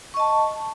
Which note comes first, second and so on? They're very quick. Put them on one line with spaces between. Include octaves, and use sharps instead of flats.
C#6 D#5 A5